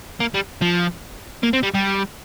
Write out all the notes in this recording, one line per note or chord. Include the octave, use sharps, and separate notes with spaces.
A#3
G3
F3
A#3
C4
G3
G3